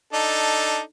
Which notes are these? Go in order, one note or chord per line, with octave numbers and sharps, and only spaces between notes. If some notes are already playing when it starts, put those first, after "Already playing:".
D4 D#4 A4